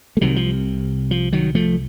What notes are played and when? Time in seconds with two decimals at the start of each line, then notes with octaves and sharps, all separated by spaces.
0.17 A3
0.21 C2 C3 D#3 F#3
0.36 F3
1.11 F3
1.33 D#3 F#3
1.55 F3 A3